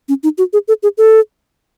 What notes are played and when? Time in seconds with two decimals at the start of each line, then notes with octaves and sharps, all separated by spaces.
0.09 C#4
0.23 D#4
0.38 F#4
0.53 G#4
0.68 A4
0.83 G#4
0.98 A4